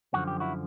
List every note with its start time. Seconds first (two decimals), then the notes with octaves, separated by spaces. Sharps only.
0.14 F#2 D3 F3 F#4
0.27 G4
0.40 E4 F#4